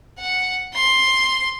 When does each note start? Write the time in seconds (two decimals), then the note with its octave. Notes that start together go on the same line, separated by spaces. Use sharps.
0.19 F#5
0.75 C6